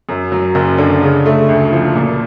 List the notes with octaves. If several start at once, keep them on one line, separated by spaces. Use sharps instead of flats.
F#2
F#3
F#1
D3
C#3
A3
D2
F3
A#2